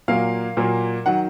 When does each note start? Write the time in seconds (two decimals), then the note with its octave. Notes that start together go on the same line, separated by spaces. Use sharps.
0.08 A#2 F#3 A#3 F5
0.57 A#2 F#3 A#3
1.06 D#3 F#3 F#5